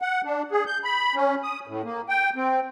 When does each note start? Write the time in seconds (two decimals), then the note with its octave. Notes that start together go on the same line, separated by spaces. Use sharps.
0.01 F#5
0.25 D4
0.52 G#4
0.67 G6
0.84 B5
1.15 C#4
1.43 D#6
1.67 A2
1.84 A#3
2.09 G5
2.36 C4